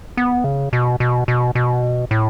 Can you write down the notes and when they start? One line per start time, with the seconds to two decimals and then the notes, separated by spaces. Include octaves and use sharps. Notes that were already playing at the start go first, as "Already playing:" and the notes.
0.17 B3
0.44 C#3
0.73 B2
1.00 B2
1.28 B2
1.55 B2
2.11 A2